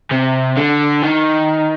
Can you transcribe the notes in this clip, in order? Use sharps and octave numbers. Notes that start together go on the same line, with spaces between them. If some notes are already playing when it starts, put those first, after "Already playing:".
C3
D3
D#3